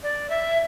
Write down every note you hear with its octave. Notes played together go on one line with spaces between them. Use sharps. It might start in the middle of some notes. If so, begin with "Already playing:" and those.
D5
E5